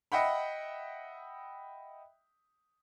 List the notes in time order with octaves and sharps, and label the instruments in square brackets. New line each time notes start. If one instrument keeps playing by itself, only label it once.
[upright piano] D#5 E5 F#5 G5 B5